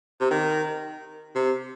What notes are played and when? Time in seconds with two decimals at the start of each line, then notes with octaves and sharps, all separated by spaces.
0.21 C3
0.31 D#3
1.35 C3